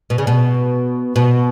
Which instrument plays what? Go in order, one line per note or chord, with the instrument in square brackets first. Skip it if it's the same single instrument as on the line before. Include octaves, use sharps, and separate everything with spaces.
[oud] B2
C#3
B2
B2